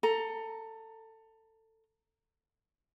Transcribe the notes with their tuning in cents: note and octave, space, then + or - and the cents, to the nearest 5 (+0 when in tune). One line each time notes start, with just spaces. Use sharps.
A4 +20 A#5 +0